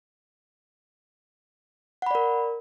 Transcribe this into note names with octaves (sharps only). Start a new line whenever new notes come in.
A#4 D5 F#5 B5